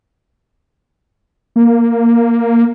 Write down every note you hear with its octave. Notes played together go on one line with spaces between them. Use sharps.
A#3